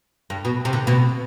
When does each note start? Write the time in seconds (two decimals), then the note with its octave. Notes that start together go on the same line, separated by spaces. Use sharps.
0.30 G2
0.45 B2
0.65 C3
0.73 D3
0.87 B2